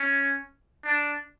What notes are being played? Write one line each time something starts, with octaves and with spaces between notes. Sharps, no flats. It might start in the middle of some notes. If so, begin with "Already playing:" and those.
Already playing: C#4
D4